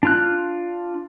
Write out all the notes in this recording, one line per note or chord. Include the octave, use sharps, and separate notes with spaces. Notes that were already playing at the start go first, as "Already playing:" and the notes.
D4 F4 F#6